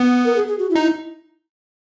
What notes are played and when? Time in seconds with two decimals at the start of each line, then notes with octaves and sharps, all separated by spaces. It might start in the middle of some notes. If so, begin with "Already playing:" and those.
Already playing: B3
0.25 A#4
0.36 G#4
0.48 G#4
0.59 F#4
0.70 E4
0.75 D#4
0.81 E4